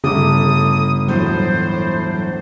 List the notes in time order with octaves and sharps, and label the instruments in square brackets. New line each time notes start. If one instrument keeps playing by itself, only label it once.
[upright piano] G1 [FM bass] C#3 [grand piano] A3 A5 D6 [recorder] D#6
[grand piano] E2 A2 [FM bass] F#3 [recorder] C5